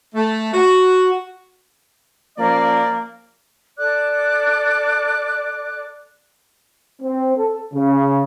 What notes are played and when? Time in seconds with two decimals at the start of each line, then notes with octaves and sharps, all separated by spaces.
0.14 A3
0.52 F#4
2.37 F3 A#3 C#4 D5
3.78 A4 D5 D6 F#6
7.02 C4
7.37 A4
7.74 C#3